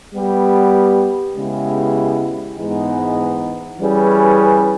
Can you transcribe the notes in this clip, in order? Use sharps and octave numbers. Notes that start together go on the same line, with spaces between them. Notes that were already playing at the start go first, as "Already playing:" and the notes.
G3 B3 G4
C#3 G#3 B3 E4 G4
G#2 E3 G#3 B3 D#4
E3 G3 C#4 G#4 B4